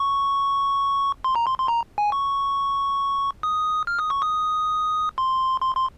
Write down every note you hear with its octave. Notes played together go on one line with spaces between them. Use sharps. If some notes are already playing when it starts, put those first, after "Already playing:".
Already playing: C#6
C6
A#5
C6
C6
A#5
G#5
C#6
D#6
F6
D#6
C#6
D#6
C6
C6
C6